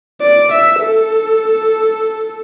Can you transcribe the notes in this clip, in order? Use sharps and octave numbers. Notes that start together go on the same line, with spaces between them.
D5
E5
A4